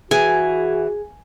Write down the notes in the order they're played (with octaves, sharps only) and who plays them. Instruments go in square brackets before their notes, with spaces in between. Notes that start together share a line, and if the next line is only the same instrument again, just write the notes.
[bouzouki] E3 [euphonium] F#4 [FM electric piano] G#4 [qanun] G#5